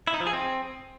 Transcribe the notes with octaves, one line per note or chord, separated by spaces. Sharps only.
E4
D#4
F3
G#4
C4